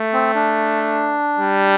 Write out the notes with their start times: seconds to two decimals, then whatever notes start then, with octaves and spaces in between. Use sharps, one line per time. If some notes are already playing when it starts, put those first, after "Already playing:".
Already playing: A3
0.13 C4
0.35 D4
1.39 G3